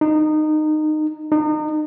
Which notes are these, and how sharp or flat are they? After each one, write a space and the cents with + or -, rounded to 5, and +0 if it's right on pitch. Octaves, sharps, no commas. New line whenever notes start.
D#4 -20
D#4 -35